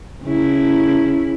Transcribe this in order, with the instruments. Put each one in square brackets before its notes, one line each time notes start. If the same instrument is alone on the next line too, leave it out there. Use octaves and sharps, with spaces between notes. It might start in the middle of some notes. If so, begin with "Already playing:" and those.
[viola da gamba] C#3 E4